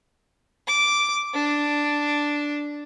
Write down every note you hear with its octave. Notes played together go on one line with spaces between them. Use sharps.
D6
D4